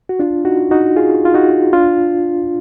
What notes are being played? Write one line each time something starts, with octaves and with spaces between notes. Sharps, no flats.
F#4
D4 F4
D#4 F#4
D#4 F#4
F4 G#4
F4
D#4 F#4
D4 F4